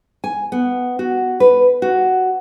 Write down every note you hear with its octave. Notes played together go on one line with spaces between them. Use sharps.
G#5
B3
F#4
B4
F#4